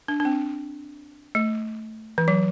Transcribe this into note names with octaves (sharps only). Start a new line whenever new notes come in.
D4
D4
C4
A3
E3
F#3